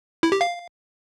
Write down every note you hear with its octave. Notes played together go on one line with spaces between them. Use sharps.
E4
G4
F5